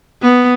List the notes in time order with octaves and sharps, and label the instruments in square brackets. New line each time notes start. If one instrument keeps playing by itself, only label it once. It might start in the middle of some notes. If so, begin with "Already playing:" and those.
[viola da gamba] B3